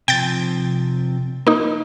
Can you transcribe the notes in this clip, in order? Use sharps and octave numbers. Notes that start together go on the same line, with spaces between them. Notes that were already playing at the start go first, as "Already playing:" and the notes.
C3 F3 G5 G6 A6
A#3 D#4